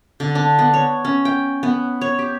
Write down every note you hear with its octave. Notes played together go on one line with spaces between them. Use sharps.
D3
D4
B3
C#5
C#4
G5
B3
C#5
G4